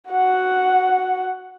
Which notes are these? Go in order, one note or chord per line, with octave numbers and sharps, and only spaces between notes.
F#4 F#5